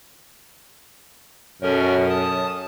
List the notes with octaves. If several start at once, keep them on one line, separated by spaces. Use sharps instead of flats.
F#2 B2 C#4 A4 A#4 C#5
A5 D#6